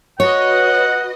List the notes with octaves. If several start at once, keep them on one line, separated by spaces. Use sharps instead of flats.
F#4 B4 C#5 D#5 F#5